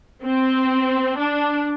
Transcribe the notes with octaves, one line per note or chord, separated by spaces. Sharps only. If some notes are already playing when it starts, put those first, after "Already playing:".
C4
D4